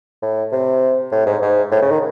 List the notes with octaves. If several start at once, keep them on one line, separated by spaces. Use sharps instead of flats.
A2
C3
A2
G#2
G#2
A2
C#3
D#3